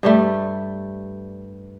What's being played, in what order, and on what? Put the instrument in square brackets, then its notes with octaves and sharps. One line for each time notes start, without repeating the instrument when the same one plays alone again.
[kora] G2 G3 A3